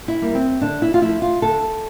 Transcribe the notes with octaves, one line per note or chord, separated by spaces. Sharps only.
E4
G3 A#3
C4
D3 D4
E4
F4
F3 A3 E4
F4
D3 A4